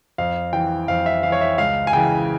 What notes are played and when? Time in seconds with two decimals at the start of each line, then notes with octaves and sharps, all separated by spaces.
0.18 F2 F5
0.53 E3 G5
0.88 F2 F5
1.06 E5
1.23 E3 F5
1.32 C#5
1.41 E5
1.58 C#2 F5
1.87 G#5
1.93 C#3 E3 G5